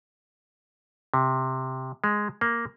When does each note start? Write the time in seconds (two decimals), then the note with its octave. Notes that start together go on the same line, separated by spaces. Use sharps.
1.14 C3
2.04 G#3
2.41 A#3